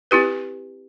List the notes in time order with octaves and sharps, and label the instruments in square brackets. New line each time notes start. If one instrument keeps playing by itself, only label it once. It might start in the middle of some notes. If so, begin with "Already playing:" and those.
[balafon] C4 E4 G4 B4